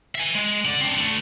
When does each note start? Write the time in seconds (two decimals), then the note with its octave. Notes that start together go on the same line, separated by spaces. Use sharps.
0.15 E5 G#5
0.35 G#3
0.65 D3 D5
0.81 C4 D4
0.97 D3 A3